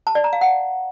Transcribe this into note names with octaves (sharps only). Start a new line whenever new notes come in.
A5
D5
A#5
F5
F#5